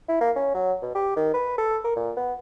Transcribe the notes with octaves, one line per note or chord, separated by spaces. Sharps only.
E4
A#3
C#4
F#3
B2
G4
D#3
B4
A4
A#4
A#2
B3